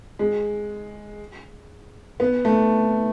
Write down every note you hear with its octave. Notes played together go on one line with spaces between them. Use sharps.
G#3
B3
A3